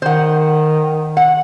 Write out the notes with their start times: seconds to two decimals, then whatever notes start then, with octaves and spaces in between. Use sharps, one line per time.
0.02 D#3 C5 F#5
1.17 F#5